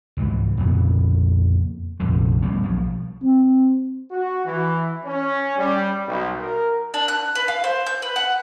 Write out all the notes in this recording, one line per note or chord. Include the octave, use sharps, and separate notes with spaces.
C#2 G#2 E3
F2 A#2 C#3 B3
F1 A#1 F2 D3
B2 G3 A#3 C#4
B1 F3 F#3
C4
F#4
E3
C#4
G3
B1
A#4
D4
F#6
B4
F5
C5
G6
B4
F#5